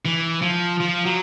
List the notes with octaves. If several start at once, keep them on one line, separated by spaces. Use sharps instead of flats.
E3
F3
F3
F#3